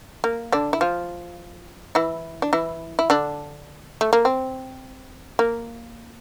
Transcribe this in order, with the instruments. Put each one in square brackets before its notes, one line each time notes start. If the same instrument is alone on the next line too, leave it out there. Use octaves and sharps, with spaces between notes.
[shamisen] A#3
D3 D4
E4
F3 F4
E3 E4
D4
E3 E4
E4
D3 D4
A3
A#3
C4
A#3